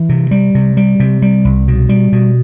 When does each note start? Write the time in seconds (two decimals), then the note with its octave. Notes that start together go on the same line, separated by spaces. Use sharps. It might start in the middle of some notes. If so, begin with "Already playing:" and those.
Already playing: E3
0.09 C3
0.31 G3
0.55 C3
0.77 G3
1.00 C3
1.22 G3
1.45 C2
1.68 B2
1.89 G3
2.12 B2